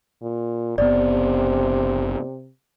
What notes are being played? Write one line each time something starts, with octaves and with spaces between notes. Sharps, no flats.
A#2
F#1 C3 B3 D5